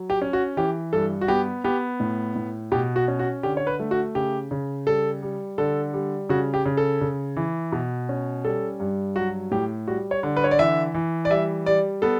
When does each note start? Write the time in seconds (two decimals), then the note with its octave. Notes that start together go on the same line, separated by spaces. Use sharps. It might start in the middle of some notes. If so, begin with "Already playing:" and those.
Already playing: F#3
0.10 G4
0.21 C#4
0.33 F#4
0.57 E3 G4
0.93 G2 A4
1.21 F#4
1.28 B3 G4
1.64 B3 G4
2.00 A2
2.36 A2
2.72 B2 G4
2.96 F#4
3.08 C#4
3.19 F#4
3.43 D3 G4
3.57 C#5
3.67 B4
3.80 A3
3.91 F#4
4.15 C#3 G4
4.51 C#3
4.87 G3 A4
5.22 G3
5.58 D3 A4
5.93 G3
6.29 C#3 F#4
6.54 G4
6.65 C#3
6.77 A4
7.01 C#3
7.36 E3
7.72 B2
8.09 C#4
8.44 G3 A4
8.80 G2
9.16 F#3 F#4
9.51 A2 G4
9.87 G3 F#4
10.11 C#5
10.23 D3
10.36 B4
10.44 C#5
10.51 D5
10.59 E3 E5
10.94 E3
11.25 D5
11.30 G3 E5
11.66 G3 D5
12.02 B3 A4